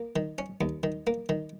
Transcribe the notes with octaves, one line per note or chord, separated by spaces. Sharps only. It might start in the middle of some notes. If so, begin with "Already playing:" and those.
Already playing: A#3
D#3
C#4
D#2
D#3
A#3
D#3